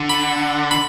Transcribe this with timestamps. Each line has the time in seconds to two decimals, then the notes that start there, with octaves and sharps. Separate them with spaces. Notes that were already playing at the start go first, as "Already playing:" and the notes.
Already playing: D3
0.10 B5
0.71 B5